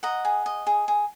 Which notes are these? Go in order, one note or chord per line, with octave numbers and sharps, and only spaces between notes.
D#5 F#5 A#5
G#4
D#5
G#4
G#4